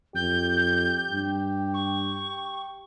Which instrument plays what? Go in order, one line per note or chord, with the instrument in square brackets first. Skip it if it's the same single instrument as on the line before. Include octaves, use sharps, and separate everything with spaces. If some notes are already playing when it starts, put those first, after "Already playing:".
[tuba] F2 [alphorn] G4 [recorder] G6
[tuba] G2
[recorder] C#6